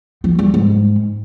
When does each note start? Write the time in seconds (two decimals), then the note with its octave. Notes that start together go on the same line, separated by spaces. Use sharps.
0.24 F3
0.39 G3
0.54 G#2